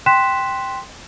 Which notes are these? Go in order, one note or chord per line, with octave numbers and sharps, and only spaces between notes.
G5 C6 F#6 B6 E7